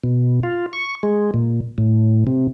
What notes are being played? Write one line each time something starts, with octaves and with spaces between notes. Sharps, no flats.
B2
F4
C#6
G#3
A#2
A2
C3